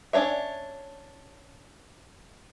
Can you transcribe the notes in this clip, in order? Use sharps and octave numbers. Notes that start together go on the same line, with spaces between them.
C#4 D4 C#5 E5